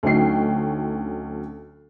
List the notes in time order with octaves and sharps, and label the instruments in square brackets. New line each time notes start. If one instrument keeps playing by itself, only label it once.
[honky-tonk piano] D2 F#3 C#4 D#4 G5 C7